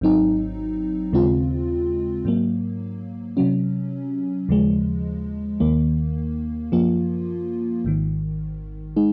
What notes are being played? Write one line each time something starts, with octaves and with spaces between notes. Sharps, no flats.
G#1 G#2 F#3 C4 D#4
D#2 C#3 G#3 C4 F4
G#2 F#3 A#3
C3 F#3 C#4
D#2 C#3 F3 G#3
D#2 D#3 A#3
F#2 F3 A#3 F4
G#1 G#2 D#3
G#3 D#4